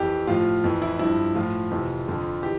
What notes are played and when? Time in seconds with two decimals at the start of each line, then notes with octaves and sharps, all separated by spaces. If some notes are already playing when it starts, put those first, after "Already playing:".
Already playing: F2 E3 G4
0.27 A2 F3 F4
0.64 F2 E3
0.82 E4
0.99 G2 F3 E4
1.35 A2 F3 F4
1.71 F2 C3 E3
2.08 F2 D3 F3
2.43 E3 G4